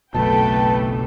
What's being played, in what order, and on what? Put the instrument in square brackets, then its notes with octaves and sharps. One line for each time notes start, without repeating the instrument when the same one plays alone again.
[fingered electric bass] F#1 B1 B2 [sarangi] A3 [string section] A4 B4 G5 [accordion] A5